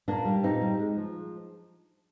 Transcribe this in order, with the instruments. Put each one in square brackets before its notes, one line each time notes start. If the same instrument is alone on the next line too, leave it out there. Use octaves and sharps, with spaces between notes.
[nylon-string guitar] A#2 A#3 D4
G3
A#2 C4 D#4
G3
G#3
F3